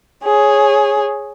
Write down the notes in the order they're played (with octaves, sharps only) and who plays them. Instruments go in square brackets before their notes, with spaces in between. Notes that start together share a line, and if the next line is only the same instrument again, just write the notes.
[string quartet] G#4 C#5